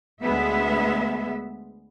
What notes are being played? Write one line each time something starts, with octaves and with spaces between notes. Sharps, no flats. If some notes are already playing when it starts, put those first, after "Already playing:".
D2 G#3 B3 E5